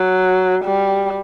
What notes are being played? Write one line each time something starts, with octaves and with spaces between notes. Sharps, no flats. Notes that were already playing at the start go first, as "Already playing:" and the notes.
Already playing: F#3
G3